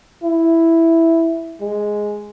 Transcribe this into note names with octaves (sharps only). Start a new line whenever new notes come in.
E4
G#3